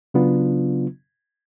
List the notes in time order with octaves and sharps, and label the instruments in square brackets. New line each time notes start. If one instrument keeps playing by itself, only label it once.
[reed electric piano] C#3 F#3 B3 D4 F4